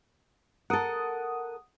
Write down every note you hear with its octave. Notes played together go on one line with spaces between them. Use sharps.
A4 A#4 F#5 D#6